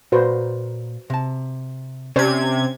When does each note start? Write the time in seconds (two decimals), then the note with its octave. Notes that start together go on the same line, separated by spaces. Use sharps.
0.12 A#2 A#3 F#4 B4 C5
1.10 C3 A5
2.16 C3 C#4 C#5 D5 G#6